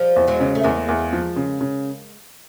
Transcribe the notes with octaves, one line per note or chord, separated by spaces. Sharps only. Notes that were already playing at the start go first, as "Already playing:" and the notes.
Already playing: F3 G3
E2
F#3 G#3
C#3
A3
E2 G#3 A#3
E2
F3
C#3
C#3